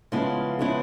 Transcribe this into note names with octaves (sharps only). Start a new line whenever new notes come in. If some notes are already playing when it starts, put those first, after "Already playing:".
C#3 F3 G#3 B3 E4
C#3 F3 G#3 B3 E4